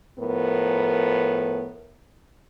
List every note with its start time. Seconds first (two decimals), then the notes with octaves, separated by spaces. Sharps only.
0.19 A2 F3 B3 A#4